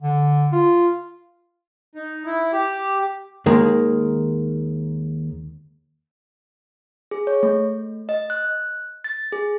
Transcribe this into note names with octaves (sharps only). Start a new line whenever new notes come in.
D3
F4
D#4
E4
G4
D#2 D#3 G#3 A#3
G#4
C#5
A3
D#5
F#6
A6
G#4